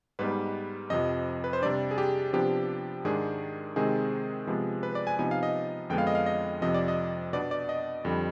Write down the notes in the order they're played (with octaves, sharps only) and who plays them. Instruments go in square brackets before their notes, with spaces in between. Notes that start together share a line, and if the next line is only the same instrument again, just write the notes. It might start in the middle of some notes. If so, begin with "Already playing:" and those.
[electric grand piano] G#2 G3 B3 D#4 B4
F2 C3 F3 D#5
B4
C5
C3 G3 D4 D5
G#4
G4
C3 F3 B3 D4 G4
G#2 D#3 G#3 D4 G#4
C3 D#3 G#3 C4 D#4 G#4
C3 F3 G#3 B3
B4
D5
G#5
C3 F3 B3 D#4 G#5
F5
D#5
F2 D3 G#3 B3 D4 G5
F5
D#5
F5
D#5
F2 C3 F3 D#5
D5
D#5
B2 B3 D4 D5
D5
D#5
F2 D3 G3